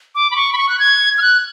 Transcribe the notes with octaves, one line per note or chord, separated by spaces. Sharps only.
D6
B5
C#6
B5
C#6
F#6
G#6
F6
F#6